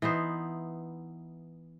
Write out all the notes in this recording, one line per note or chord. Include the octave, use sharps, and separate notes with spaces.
E3 B3 D#4 C5